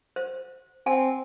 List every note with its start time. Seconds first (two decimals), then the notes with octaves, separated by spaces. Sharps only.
0.16 C5
0.86 C4 G#5 A5